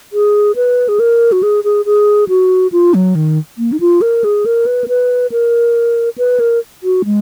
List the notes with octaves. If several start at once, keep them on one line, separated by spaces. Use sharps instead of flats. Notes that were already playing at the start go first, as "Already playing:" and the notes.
G#4
B4
G#4
A#4
F#4
G#4
G#4
G#4
F#4
F4
F#3
D#3
A#3
D#4
F4
A#4
G#4
A#4
B4
A#4
B4
A#4
B4
A#4
F#4
G#3